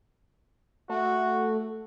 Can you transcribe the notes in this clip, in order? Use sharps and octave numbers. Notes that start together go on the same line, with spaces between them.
A3 F#4